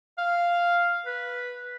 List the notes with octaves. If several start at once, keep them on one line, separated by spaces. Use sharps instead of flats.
F5
B4